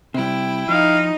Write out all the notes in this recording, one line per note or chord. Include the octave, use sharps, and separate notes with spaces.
C3 G3 E4 G5
F3 D#4 F5